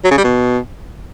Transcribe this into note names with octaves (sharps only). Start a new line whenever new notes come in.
F#3
C#3
G3
B2